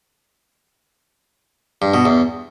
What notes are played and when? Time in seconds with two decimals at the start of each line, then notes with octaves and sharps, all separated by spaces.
1.82 G2
1.94 B2
2.05 E2